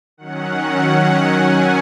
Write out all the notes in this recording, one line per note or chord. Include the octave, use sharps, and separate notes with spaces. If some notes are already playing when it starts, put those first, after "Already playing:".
D#3 F#3 C#4 F#5
G#5